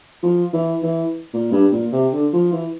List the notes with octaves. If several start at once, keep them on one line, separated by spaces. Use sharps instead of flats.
F3
E3
E3
A#2
G2
A#2
C3
D3
F3
E3